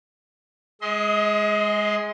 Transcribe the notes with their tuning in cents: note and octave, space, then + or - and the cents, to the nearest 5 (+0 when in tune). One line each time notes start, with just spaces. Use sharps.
G#3 +0 D#5 +35 C6 +0